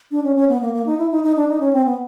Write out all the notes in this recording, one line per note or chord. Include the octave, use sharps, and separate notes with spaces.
D4
C#4
C#4
B3
A#3
A#3
D#4
E4
D#4
D#4
D4
D#4
C#4
C4
B3